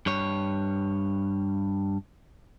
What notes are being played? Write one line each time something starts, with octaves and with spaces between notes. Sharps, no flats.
G2 C#5